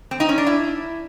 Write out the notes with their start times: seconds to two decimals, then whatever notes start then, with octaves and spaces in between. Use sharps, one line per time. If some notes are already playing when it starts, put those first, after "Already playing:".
0.11 C4
0.20 D#4
0.29 C#4
0.38 D4
0.47 E4